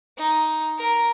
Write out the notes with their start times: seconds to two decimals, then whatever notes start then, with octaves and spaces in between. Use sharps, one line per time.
0.18 D#4
0.78 A#4